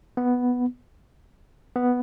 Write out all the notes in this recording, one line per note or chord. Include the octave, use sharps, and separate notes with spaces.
B3
B3